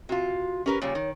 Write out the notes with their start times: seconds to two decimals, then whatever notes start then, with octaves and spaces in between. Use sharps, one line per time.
0.09 C3 F4 F#4
0.66 C#4 G4 A#4 B4
0.82 A#2 C#3 G3 C#5
0.95 D#3